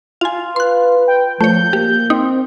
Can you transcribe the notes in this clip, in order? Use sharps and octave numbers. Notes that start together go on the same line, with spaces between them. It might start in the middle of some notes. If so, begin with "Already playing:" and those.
F4 F5 G#5
B4 C6 F#6
G5
F3 A3 C#5 G6
A#3 G4
C4 D#4